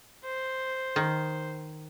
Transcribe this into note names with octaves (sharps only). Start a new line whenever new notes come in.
C5
D#3